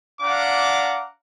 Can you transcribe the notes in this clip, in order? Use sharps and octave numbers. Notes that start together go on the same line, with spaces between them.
D4 F5 F#5 A#5 D6